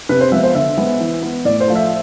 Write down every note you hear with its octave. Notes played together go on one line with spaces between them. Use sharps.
C3 B4
C5
F3 G#3 B3 E5
C5
D3 E5
G#3 B3
E3
B3
A2 D5
C5
F3 A3
E5